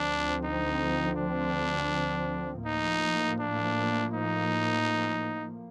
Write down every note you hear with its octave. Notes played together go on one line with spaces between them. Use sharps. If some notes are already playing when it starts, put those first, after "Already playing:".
Already playing: D2 D3 F3 C4 D4
D#4
D4
A2 F3 A#3 D#4
D4
D#4